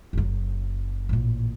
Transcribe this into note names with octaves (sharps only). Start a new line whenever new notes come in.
F#1 F#2
A1 A#2